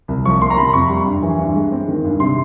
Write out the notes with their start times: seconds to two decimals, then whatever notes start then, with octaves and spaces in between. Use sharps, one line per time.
0.08 C2
0.25 F3 C#6
0.42 A#3 C6
0.50 A#5
0.57 C3 B5
0.73 F2 C#6
0.89 G3
1.06 G2
1.22 E3
1.39 G2
1.55 G#3
1.72 C4
1.88 D#3
2.04 G2
2.20 C3 C6